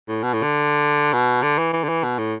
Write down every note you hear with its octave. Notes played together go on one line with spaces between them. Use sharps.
A2
B2
A2
D3
B2
D3
E3
E3
D3
E3
B2
A2